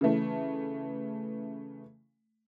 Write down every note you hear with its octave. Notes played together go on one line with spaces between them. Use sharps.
C#3 E3 A3